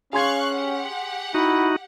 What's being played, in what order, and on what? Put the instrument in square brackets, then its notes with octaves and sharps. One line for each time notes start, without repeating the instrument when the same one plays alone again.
[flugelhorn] C#4 [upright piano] G#4 C6 G#6 [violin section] F5 C#6 F#6
[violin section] G4 F#5
[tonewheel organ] D#4 F#4 [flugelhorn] E4